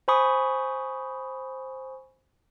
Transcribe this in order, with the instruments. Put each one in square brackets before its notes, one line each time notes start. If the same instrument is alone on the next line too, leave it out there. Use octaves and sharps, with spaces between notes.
[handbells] C5 G#5 B5 C#6 D#6